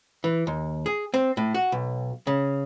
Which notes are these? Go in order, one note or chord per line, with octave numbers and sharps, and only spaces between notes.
E3
D#2
G#4
C4
A2
F#4
B1
C#3